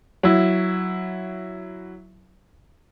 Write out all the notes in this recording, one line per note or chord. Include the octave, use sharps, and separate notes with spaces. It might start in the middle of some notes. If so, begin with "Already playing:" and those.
F#3 E4